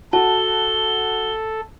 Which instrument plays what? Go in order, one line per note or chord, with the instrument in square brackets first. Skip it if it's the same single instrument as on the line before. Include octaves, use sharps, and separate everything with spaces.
[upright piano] F#4 [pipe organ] A4 [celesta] A5 [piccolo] G7